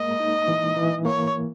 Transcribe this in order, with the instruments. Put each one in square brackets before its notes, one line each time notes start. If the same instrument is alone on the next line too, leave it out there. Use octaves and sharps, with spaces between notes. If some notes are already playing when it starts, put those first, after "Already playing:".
Already playing: [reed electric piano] G#3 A#3 [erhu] D#5
[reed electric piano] D#4
E3
E3
[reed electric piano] A#3 [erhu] C#5